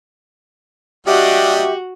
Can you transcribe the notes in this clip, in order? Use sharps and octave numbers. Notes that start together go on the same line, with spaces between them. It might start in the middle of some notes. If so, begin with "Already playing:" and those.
G3 D4 F#4 G4 D#5 E5